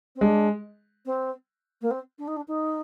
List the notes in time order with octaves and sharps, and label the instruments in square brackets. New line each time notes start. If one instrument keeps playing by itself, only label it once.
[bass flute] C4
[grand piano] G#3 [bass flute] D4
[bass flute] C4
A#3
C4
D4
D#4
D4
D#4